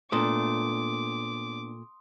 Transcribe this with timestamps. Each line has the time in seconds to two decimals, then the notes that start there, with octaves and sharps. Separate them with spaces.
0.12 A#2 A3 B3 D4 C6 D6 D#6